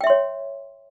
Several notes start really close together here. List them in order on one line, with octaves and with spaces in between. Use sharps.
G5 E5 C6 C#5